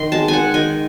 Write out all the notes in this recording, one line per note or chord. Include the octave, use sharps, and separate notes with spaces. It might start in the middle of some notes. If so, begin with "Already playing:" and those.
Already playing: D#3 C6
G#3 A5
F#5 G#5
D#3 G#5